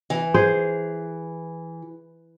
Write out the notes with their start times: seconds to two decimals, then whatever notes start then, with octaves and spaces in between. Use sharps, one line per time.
0.10 E3
0.34 G#4 C5